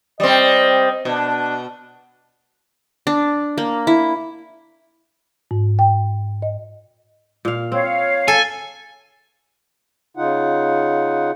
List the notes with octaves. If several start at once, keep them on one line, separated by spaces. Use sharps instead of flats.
G3 C4 D#5
B2 D4
D4
A#3
E4
G#2
G5
D#5
A#2 F5
C4 C#5 F5
A4 G#5
C#3 D#4 F4 F#5